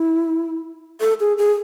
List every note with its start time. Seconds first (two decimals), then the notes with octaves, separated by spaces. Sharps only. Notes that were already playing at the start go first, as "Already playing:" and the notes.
Already playing: E4
1.01 A4
1.20 G#4
1.38 G#4